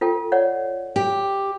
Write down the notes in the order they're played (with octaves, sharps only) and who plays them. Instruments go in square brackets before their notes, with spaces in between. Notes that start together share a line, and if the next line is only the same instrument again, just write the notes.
[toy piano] F4 A4 G5
C#5 D5 F#5
[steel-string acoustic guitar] G4